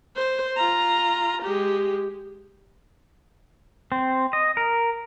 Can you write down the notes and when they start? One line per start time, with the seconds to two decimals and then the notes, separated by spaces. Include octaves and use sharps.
0.16 C5
0.57 F4 A#5
1.43 G#3 G4
3.92 C4
4.33 D#5
4.57 A#4